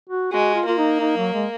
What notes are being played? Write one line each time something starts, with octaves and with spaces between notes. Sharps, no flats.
F#4
G#3 F#4
F4
A#3 F4
D#4
D#4
F#3
G#3